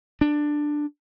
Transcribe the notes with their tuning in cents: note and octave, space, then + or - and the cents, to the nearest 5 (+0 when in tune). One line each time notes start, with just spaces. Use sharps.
D4 +10